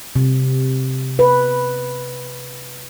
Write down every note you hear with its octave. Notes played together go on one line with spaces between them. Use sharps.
C3
B4